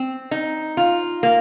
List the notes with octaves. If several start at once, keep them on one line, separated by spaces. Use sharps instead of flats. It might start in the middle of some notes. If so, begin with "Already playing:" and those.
Already playing: C4
D#4
F4
A#3